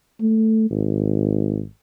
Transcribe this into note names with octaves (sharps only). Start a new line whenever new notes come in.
A3
G#1